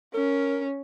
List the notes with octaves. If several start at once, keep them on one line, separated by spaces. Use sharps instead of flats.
C#4 A#4